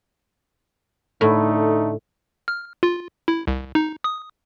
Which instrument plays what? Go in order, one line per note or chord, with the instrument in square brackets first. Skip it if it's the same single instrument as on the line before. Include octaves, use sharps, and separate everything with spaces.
[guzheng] A2 [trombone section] D3 A3 D#4
[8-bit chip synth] F6
F4
E4
C2
D#4
D#6